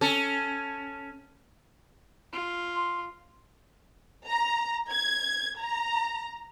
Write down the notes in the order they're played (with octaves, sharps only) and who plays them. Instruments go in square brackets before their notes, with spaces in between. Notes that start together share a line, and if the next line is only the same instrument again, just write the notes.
[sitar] C#4 A4
[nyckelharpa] F4
[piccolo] C6
[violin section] A#5
G#6
A#5